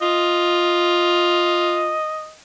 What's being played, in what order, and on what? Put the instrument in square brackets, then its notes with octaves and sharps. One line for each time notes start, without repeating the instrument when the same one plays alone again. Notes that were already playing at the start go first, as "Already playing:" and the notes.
[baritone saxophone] F4 [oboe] D#5